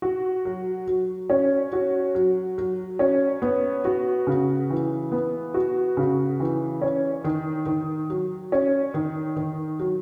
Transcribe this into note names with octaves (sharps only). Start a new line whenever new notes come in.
F#4
F#3
F#3
C#4
F#4
F#3
F#3
C#4
B3
F#4
C#3
E3
B3
F#4
C#3
E3
C#4
D#3
D#3
F#3
C#4
D#3
D#3
F#3